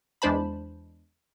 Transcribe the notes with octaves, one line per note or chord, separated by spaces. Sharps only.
E2 G#3 D4 C5 A5 B5